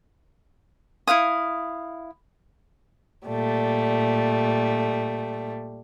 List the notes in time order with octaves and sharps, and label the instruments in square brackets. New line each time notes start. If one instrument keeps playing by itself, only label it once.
[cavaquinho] E4 C5 F5 D#6
[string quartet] A#2 G3 A3